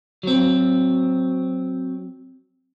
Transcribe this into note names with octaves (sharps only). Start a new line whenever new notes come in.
F#3 C4